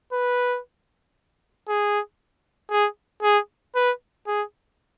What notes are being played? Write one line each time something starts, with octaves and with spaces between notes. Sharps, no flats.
B4
G#4
G#4
G#4
B4
G#4